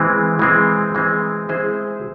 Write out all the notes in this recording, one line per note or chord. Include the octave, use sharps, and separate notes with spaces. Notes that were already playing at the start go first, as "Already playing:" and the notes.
Already playing: E3 G#3 C4
E3 G#3 C4
E3 G#3 C4
G#3 C4 E4 G#4 C5